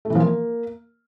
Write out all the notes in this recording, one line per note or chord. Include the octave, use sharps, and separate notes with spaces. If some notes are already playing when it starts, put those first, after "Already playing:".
A3
E3
F3
A#3